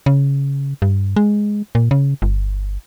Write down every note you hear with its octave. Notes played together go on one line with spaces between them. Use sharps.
C#3
G2
G#3
A#2
C#3
G1